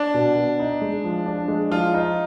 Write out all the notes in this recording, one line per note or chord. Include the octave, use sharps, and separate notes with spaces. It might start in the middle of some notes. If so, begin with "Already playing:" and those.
Already playing: D4
B2
B2
D#4
G#3
F3
D4
G#3
F3 F4
D#4